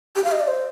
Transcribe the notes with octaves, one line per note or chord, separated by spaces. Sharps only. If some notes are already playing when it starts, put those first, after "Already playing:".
G4
F5
D#5
D5
C5